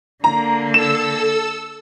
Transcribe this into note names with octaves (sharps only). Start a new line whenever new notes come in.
D3 A#3 A#5
A4 E6 E7